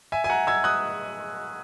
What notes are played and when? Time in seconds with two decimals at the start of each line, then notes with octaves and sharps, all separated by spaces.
0.12 E5 G#5
0.24 G#5
0.30 F#5 A#5
0.47 E6 G#6
0.64 D#6 F#6